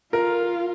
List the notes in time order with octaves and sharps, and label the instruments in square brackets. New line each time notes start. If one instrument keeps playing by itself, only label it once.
[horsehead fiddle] F4 [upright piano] A#4